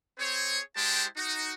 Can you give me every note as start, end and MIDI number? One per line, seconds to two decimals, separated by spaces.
0.19 0.59 60
0.19 0.59 68
0.19 0.59 72
0.19 0.59 73
0.76 1.04 56
0.76 1.04 64
0.76 1.04 67
0.76 1.04 72
0.76 1.04 79
0.76 1.04 81
1.17 1.53 63
1.17 1.53 66